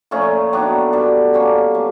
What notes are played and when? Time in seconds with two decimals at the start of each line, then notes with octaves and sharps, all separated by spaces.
0.11 A#2 F3 A3 C#4
0.53 D#3 F#3 B3 D4
0.93 B2 G3 B3 D4
1.34 D3 G3 A#3 C#4
1.74 B2 F#3 A3